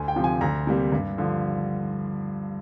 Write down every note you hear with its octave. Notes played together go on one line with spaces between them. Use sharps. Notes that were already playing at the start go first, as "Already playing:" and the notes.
Already playing: D2 G#5
G5
C3 F3
G#5
D2 A#5
C3 G3 A#3
G2
D3 F3